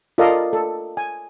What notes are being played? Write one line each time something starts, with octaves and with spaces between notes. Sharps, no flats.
F4 A4 A#4 D5 D#5 F5
A4
G#5